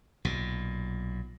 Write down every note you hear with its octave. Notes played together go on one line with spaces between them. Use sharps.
B1 A#2